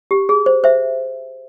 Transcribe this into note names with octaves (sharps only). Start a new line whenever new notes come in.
G4
G#4
C5
C5 E5